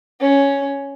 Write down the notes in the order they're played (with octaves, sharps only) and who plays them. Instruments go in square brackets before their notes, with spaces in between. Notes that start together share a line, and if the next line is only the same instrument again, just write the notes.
[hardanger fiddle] C#4